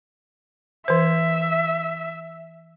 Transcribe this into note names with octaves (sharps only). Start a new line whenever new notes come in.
E3 C5 E5